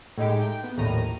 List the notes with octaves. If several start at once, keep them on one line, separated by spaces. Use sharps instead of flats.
A2 G#3 D#4 G4
G5
B3
A#1 D#2 A2 A#5 D#7